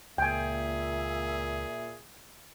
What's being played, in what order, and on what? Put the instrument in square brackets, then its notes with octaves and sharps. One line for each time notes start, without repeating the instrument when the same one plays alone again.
[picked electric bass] C#2 [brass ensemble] A#2 E5 [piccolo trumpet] G#4 [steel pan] G5 G#5